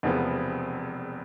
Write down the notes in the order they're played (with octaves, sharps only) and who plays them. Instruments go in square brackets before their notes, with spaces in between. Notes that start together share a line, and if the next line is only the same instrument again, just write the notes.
[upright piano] E1 E2 C3 F3 B3